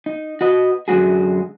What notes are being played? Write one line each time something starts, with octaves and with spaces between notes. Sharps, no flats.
D#4
F#4 B4 D#5
F#2 D3 G#3 F#4 G#4